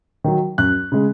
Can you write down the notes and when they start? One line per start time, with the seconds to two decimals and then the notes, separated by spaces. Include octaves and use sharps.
0.24 D#3 F#3
0.58 F#2 F#6
0.92 C#3 G#3